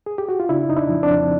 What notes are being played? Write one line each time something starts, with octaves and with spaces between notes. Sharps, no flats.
G#4
G4
F#4
F4
C#3 D4 E4
F2 D#4
D4 E4
F3
C4 D4
F2